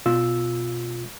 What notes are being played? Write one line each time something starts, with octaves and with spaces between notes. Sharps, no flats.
B2 F4 E6